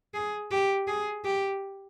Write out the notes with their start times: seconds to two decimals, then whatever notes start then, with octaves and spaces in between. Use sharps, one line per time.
0.14 G#4
0.51 G4
0.87 G#4
1.24 G4